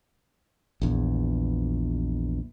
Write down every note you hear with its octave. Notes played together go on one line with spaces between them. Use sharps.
A#1 E2